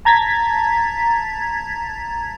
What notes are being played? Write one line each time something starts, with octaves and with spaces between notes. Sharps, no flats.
A5 A#5 G#6 A6 B6